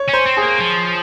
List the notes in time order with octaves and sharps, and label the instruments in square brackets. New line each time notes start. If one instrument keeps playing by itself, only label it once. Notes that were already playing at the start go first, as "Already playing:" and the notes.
Already playing: [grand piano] C#5
[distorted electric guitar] C#4
[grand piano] C5
[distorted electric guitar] C4
[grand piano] G#4
[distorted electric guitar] A#3
F3